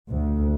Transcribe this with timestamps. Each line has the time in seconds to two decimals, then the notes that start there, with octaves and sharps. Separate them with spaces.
0.11 D2